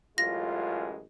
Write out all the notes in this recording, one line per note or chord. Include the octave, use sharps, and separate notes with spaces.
A1 F#2 G#3 F4 A#6